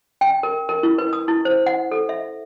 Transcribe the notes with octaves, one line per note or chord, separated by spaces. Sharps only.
G5
A#4
A#4
E4
B4
D#6
E4
C5
F#5
A4
E5